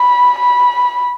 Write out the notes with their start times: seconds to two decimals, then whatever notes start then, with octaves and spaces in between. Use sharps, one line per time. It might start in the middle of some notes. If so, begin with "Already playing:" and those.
Already playing: B5
0.38 B5